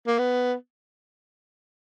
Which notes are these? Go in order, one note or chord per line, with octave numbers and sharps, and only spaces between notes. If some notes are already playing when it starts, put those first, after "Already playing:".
A#3
B3